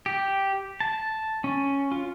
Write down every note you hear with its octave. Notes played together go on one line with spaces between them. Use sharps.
G4
A5
C#4
F4